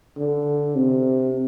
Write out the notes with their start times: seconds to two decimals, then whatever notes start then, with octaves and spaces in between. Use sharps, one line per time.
0.18 D3
0.76 C3